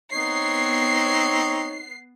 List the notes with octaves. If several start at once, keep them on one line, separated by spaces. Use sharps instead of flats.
B3 C4 D#4 C#5 C7